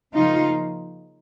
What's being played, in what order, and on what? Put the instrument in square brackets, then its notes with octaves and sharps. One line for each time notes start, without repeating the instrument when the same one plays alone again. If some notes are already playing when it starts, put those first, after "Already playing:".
[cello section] C#3 F3 A#3 D#4 F4